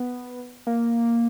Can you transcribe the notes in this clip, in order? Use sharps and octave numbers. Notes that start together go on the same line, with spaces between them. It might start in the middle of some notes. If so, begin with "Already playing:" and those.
Already playing: B3
A#3